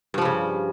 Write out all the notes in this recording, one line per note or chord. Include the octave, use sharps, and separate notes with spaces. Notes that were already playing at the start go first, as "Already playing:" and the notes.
G2 C#3 F3 G3